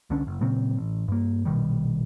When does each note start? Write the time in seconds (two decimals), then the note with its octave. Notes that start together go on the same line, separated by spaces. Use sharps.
0.10 C2 D3 C#4 D4
0.27 F#1
0.41 A#2 C#3 F#3 C4
0.77 A1
1.08 G2 A#3
1.45 A#1 B2 D#3 G3